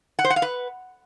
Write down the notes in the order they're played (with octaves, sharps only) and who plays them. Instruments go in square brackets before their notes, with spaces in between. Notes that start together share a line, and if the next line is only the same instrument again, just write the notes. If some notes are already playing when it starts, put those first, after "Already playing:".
[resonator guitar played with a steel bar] F#5
C5
F#5
F5
B4